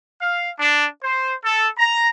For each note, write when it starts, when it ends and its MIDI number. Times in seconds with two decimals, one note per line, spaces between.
0.19 0.49 77
0.58 0.85 62
1.01 1.31 72
1.43 1.69 69
1.76 2.07 82